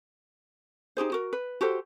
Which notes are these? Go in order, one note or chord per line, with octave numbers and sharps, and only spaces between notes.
D#4 G4 G#4 C5
F#4 A#4
B4
F#4 G4 A4 C5